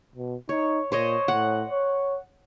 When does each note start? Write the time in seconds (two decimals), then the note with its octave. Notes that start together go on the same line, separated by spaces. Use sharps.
0.15 B2
0.49 D#4 C#5
0.92 A#2 C5 C#5 D#5
1.28 A2 F#5
1.70 C#5